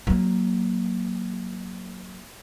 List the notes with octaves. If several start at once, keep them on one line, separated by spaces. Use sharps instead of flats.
F#3 A#3